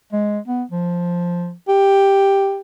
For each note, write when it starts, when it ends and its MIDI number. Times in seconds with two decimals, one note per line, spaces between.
0.13 0.39 56
0.48 0.63 59
0.71 1.52 53
1.68 2.60 67